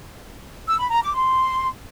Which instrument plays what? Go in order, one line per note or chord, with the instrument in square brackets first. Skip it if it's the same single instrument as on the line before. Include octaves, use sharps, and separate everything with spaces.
[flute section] E6
B5
A#5
D6
C6